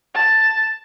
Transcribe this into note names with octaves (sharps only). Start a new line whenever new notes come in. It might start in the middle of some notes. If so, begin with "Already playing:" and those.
A5